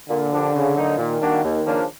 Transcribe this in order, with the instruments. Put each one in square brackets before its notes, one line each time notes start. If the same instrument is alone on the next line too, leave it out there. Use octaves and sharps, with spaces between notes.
[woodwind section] A#2 [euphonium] D3
[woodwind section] F3 A#3 D4 G4
C#3
F#3 A#3 D#4
[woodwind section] A#2 [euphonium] D#3
[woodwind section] G3 A#3 D4 F#4
D#2
C#3 F3 A#3 D4